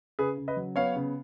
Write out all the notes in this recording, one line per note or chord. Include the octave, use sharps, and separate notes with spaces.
C#3 G#4 B4
C#3
B4 D#5
F#3
B3 C#5 F5
C#3